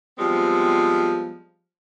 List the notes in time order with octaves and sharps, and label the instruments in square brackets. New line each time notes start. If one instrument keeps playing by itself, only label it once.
[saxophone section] F3 G3 G#3 B3 C4